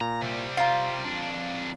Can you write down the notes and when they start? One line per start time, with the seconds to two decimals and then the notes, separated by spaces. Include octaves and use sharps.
0.01 A#2 A#5
0.21 C3 G3
0.57 F4 F5 A#5
1.04 F2 D4